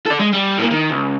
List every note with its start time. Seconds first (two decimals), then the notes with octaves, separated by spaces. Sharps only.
0.07 A4 D5
0.20 G#3
0.33 G3
0.58 A2 A#3
0.71 D#3
0.90 C#2